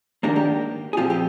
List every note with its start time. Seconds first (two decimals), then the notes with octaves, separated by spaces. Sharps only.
0.23 G#2 D#3 A#3 D4 G4 A#4
0.36 G4
0.93 G#4
0.97 A#2 F3 C4 F4 G4
1.10 G4